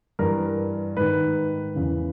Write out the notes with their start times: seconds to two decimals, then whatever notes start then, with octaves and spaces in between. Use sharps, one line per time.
0.19 G2 E3 A#4
0.97 G#2 D#3 B4
1.75 E2 C#3 E3